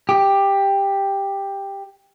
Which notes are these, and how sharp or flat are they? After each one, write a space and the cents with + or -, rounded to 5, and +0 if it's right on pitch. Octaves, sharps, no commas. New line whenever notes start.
G4 +10